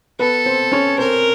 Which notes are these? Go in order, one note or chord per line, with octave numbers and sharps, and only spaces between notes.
B3 A4 B4
C4 C5
C#4 C#5
C4 A#4 C5